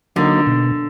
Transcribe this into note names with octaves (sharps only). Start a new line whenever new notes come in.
D3 F#3 A#3 D#4
B2